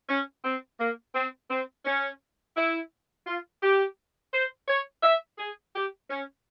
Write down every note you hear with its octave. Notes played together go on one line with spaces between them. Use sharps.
C#4
C4
A#3
C4
C4
C#4
E4
F4
G4
C5
C#5
E5
G#4
G4
C#4